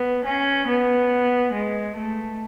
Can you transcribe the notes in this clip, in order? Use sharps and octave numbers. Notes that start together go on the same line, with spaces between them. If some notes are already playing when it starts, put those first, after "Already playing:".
Already playing: B3
C#4
B3
G#3
A3